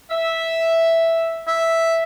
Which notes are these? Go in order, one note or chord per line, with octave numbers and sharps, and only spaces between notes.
E5
E5